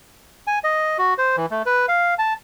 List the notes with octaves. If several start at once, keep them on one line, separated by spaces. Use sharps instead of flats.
G#5
D#5
F#4
C5
E3
A3
B4
F5
A5